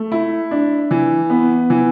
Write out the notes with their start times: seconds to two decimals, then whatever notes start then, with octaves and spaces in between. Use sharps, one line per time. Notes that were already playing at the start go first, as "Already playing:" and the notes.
Already playing: A3
0.12 E4
0.51 D4
0.91 E3
1.30 B3
1.70 E3